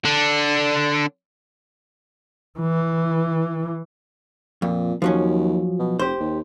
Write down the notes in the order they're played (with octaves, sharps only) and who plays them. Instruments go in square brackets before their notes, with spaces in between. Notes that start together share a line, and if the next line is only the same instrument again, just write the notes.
[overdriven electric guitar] D3 D4
[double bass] E3
[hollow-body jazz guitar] F2 [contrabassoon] A#2
[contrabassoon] D#2 [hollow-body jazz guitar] F3 F#3 C#4
[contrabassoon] B2
[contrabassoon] F1 [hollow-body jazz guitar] G4 C5
[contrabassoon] D#2